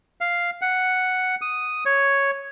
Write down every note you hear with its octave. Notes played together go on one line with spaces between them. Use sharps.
F5
F#5
D#6
C#5